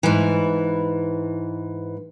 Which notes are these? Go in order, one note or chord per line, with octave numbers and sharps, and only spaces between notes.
G#2 E3